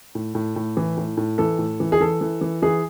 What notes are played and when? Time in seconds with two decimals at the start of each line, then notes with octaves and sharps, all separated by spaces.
0.15 A2
0.35 A2
0.56 A2
0.77 E3
0.97 A2
1.17 A2
1.38 E3 A4
1.59 A2
1.80 E3
1.92 G#4
2.01 E3 A4
2.21 E3
2.41 E3
2.62 E3 G#4